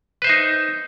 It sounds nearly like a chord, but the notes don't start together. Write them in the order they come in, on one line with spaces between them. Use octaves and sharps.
B4 C5 E5 D#4